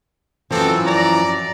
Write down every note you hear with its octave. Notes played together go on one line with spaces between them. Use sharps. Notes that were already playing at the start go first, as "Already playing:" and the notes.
F#2 E3 F3 C4 A4
D5 A#5